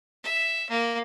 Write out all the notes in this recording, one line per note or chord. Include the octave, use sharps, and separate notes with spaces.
E5
A#3